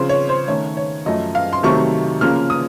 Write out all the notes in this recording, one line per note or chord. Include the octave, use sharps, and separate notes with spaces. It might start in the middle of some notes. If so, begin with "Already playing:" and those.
Already playing: C#3 F3 C4 C5
C#5
C5
D#3 A3 C#4 C#5
C#5
F#2 F3 A3 D#5
F5
C6
C3 D#3 F#3 A3 C#6
C#3 F3 A#3 C#4 F6
D#6